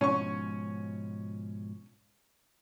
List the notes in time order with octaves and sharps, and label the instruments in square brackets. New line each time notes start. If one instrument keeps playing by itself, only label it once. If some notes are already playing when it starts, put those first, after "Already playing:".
[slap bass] G#2 B2 F3 [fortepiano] C#4 C#6